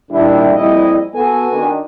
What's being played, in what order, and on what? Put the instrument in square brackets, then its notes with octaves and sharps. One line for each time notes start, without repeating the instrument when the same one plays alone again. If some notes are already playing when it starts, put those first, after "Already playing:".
[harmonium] A#2 D#3 D4 [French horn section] G3 E4
[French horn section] F2 A#2 G3 [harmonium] E4 D#5
[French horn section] B3 A4 [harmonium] F#4 G#5
[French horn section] D#3 D4